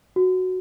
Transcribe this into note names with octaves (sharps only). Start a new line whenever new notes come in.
F#4